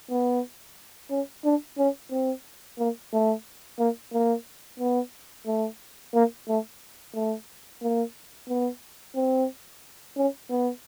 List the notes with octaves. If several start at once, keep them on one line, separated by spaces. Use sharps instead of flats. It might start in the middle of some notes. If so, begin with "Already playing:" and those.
B3
C#4
D4
C#4
C4
A#3
A3
A#3
A#3
B3
A3
A#3
A3
A3
A#3
B3
C4
C#4
B3